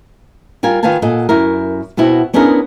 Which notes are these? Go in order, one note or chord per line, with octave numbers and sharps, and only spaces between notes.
G3 F4 A#4 G#5
D#3 F4 B4 F5 G#5 A5
A#2 A4 D#5 F#5 G#5
F#2 E4 A#4
B2 B3 C4 E4 F#4
B3 C#4 D4 E4 G#4 A#4